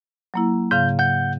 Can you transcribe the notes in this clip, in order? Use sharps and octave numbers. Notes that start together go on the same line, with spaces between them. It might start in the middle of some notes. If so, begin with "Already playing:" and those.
F#3 A#3 E4
G#2 C#3 F5 G6
F#5 G6